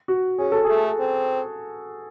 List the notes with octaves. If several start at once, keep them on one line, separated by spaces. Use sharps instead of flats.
F#4
C#4 G#4
A4
A3 G#4
C4